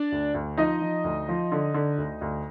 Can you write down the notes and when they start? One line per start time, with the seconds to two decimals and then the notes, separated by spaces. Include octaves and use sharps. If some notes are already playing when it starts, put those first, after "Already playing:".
Already playing: D4 D5
0.12 D2
0.34 D2
0.57 F3 D#4 D#5
0.81 F3
1.04 D2
1.29 F3
1.52 D3
1.74 D3
1.98 D2
2.21 D2